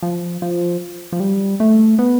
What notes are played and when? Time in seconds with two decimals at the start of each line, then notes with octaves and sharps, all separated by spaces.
0.03 F3
0.42 F3
1.12 F3
1.20 G3
1.60 A3
1.99 B3